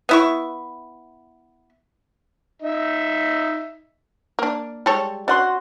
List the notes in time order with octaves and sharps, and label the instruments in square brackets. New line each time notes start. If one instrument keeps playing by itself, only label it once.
[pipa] B3 E4 C#6
[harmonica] D#4 E5
[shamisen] A#3 D4
[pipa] G3 [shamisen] G#3 A4 C#5
[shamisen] C#4 [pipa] D4 F#5 C6 [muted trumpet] F#4